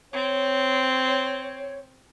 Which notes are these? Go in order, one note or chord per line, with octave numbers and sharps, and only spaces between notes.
C4 C#5